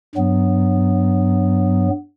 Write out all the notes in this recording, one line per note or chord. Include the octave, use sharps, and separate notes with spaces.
G2 F#3 B3